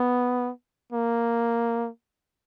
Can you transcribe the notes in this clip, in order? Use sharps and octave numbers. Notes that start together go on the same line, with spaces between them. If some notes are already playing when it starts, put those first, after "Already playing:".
Already playing: B3
A#3